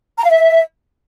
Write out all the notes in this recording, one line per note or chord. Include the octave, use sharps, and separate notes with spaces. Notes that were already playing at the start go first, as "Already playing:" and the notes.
A#5
F5
E5